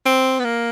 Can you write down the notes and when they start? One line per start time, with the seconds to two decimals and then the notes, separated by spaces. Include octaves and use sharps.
0.06 C4
0.40 B3
0.44 A#3